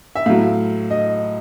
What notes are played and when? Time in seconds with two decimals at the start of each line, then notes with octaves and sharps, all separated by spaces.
0.15 E5
0.26 A2 F#3 F5
0.90 D#5